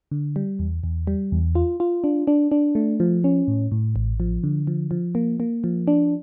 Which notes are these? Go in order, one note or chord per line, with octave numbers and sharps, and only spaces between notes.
D3
G3
E2
E2
G3
E2
F4
F4
D4
D4
D4
A3
F3
C#4
A2
A2
A1
F3
D3
F3
F3
A#3
A#3
F3
D4